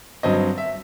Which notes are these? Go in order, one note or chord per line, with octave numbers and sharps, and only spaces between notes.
G2 F#3 C4 D#5
E5